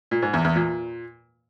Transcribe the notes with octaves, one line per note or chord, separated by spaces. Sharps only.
A#2
G#2
E2
E2
A#2